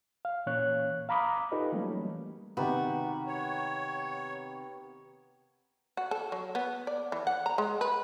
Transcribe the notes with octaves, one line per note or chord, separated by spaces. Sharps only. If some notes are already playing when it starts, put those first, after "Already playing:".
F5
A#2 E3 A#3 C#4 C#5 F#6
F5 A#5 B5 D6 D#6
D#4 F4 G4 A4 B4 D#5
E3 F#3 G3 A3 A#3 C#4
C3 D#3 B3 F#4 G4 A#4
C#5
F#4
A4
F#3
B3
D5
E3
F#5
A#5
G#3
B4